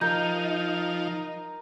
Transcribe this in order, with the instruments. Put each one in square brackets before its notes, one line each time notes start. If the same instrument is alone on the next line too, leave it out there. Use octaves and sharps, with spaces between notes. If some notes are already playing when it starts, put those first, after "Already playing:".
[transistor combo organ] F3 [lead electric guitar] D#4 [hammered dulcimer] A#4 [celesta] G6